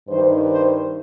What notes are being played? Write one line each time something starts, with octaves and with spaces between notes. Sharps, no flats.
G2 D#3 C5
C5